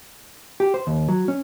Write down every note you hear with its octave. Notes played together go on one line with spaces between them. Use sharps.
G4
C5
D#2
F#3
C#4